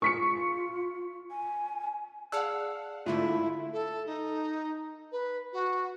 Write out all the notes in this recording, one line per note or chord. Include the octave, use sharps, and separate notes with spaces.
F4 C#6 B6 C#7
G#5
G#4 D5 F5 F#5 A5 E6
G#2 D3 A3 E4 F4
A4
D#4
B4
F#4